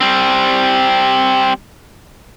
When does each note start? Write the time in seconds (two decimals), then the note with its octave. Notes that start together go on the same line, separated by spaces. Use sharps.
0.01 G3 C4